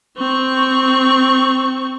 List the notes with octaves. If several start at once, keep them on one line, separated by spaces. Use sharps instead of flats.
C4 C#6